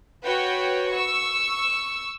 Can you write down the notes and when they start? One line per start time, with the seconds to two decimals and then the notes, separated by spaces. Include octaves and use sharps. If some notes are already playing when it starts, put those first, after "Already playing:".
0.24 F#4 B4 C#5 G5
0.92 C#6 E6